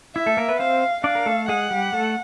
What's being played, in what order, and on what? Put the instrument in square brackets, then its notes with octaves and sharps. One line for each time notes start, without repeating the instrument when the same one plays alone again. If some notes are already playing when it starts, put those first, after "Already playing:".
[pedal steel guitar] E4 [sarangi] E5
[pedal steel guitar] A3 A4
A#3 A#4
B3 B4
[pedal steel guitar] C4 C5 [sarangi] F5
[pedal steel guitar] D4 D5 [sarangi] F5
[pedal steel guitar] A#4
A3 A4
[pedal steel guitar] G#3 G#4 [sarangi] F#5
[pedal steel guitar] G3 G4
A3 A4